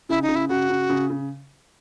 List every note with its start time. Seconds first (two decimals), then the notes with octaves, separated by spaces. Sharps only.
0.09 C#3 E4
0.23 D#4
0.28 C#3
0.36 E4
0.49 C#3 F#4
0.69 C#3
0.89 C#3
1.10 C#3